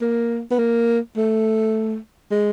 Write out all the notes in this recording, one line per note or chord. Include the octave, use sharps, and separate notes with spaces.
A#3
B3
A#3
A3
G#3